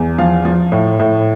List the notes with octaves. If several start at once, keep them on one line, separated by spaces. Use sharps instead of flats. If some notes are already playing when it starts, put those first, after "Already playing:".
Already playing: E2
F3 F5
F3
A2
A2